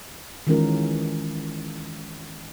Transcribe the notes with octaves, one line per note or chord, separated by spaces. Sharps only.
D#3 E3 G#3 C#4 F4 A#4